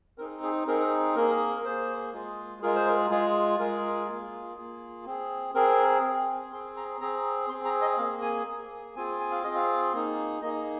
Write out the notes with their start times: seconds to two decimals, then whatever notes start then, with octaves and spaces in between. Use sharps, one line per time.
0.18 C4 D#4 G#4 A#4
0.43 G#4
0.67 C4 D#4 G#4 A#4
1.16 A#3 G#4 A#4
1.56 A#4
1.64 A#3 G#4 C5
2.13 G#3 F4 G#4
2.62 G#3 F4 G#4 A#4
2.75 C5
2.88 A#4
3.10 G#3 F4 G#4
3.59 G#3 F4 G#4 A#4
4.08 A#3 F4 G#4
4.57 A#3 F4 G#4
5.06 C4 G#4
5.54 C4 G#4 A#4
6.03 C4 G#4
6.52 C4 G#4 C6
6.77 A#5
7.01 C4 G#4 A#5
7.49 C4 G#4 C6
7.65 A#5
7.81 D#5
7.98 A#3 G#4 F5
8.22 G#5
8.47 A#3 G#4
8.96 C4 F4 G#4 G#5
9.20 G#5
9.31 F5
9.44 C4 F4 G#4 D#5
9.56 F5
9.93 A#3 D#4 G#4
10.42 A#3 D#4 G#4 D#5